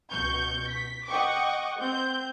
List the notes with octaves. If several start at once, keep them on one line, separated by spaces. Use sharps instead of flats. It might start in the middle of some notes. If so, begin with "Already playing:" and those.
C#2 B2 C#6 G6
B6
D#5 F#5 G5 C#6 D6
C4 G6